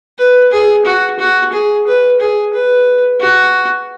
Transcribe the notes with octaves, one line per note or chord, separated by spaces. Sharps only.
B4
G#4
F#4
F#4
G#4
B4
G#4
B4
F#4